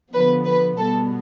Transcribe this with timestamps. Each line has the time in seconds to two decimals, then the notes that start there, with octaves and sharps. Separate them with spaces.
0.14 D3 F3 B3 B4
0.46 B4
0.78 B2 G3 B3 A4